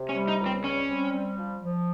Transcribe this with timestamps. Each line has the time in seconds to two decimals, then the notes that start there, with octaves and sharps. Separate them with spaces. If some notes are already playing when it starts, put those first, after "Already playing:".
Already playing: C3
0.09 C#4
0.15 G3
0.28 D#4
0.40 C#2
0.46 C4
0.64 G3 C#4
0.90 C4
1.14 G3
1.38 F3
1.62 F3